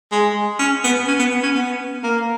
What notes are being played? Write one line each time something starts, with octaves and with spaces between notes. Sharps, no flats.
G#3
C#4
B3
C#4
B3
B3
C#4
B3
A#3